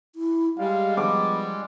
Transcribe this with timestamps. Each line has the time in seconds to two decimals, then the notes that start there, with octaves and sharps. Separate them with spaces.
0.15 E4
0.58 G3 G#3 G4 F5
0.97 F3 B3 D6